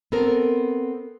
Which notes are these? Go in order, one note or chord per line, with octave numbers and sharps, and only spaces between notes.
B3 C4 A4 A#4